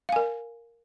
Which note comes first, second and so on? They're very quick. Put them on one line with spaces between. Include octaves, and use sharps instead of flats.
F5 G#5 A#4